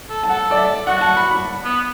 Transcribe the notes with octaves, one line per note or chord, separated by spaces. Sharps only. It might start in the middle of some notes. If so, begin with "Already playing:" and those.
A4
A5
A4 F#5
D5
E5
F#4 F#5
A5
B5
B5
B3